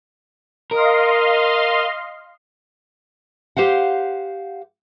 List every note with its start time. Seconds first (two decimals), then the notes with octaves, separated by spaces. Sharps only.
0.71 A#4 D#5 F5 C6
3.57 G4 C5 F5 F#5